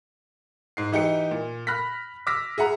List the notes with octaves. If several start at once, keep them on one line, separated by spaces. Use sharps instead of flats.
G#2 C7
E3 D#4 G4 C#7
A#2
B5 F6 F#6 A#6 B6
D6 E6 F6 A#6 B6
G#4 E5 F#5 A#5